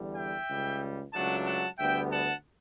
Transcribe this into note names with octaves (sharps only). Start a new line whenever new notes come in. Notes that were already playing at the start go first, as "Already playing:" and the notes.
Already playing: E2 D3 G3
E5 G5
C#2 C#3 G3
C#2 C#3 F#3 A3 D4 F#5 A5
F#5 A5
D2 D3 G3 B3 E5 G5
F#5 A5